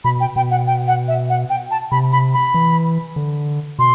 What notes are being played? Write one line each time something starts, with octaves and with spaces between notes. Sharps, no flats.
B2 B5
G5
B2 G5
F#5
G5
F#5
E5
F#5
G5
A5
C3 B5
B5
B5
E3
D3
B2 C6